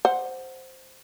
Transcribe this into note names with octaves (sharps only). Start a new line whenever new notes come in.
C5 F#5